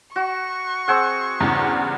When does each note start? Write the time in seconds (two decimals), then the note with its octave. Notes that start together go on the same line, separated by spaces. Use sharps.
0.16 F#4 C#6
0.88 C4 G#4 F#5
1.40 E2 G2 C#3